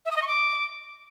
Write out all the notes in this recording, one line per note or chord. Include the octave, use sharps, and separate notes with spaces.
E5
D#6
D#5
C#6
D6